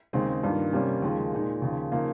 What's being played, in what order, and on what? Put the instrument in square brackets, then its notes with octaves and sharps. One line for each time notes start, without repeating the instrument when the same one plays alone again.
[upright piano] D#2 C#3 G#3 C4 D#4
G2 D#3 A#3 F4
C3 G3 A#3 C#4
D#2 C#3 F3 G#3
A#2 G#3 D#4
D#2 C#3 F3
C#3 F3 A#3 D#4